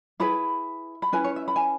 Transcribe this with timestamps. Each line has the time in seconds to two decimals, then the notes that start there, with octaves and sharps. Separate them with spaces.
0.20 E4 G#4 B4 B5
1.02 B5
1.12 C#4 E4 B4 G#5
1.24 C#5
1.36 E5
1.48 B5
1.56 G#5